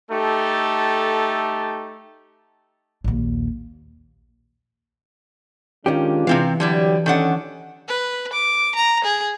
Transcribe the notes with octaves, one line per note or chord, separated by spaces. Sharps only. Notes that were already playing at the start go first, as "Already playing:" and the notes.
A3 D#4 G4 A4
A#1 D#2
D#3 G#3 C#4 D4 F4 G4
C3 E3 C4 F5
D3 F#3 G3 E4 G4
D#3 C#4 D4 A4 D5 F#5
B4
D6
A#5
G#4